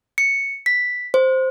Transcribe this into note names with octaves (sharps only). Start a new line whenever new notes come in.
C#7
B6
C5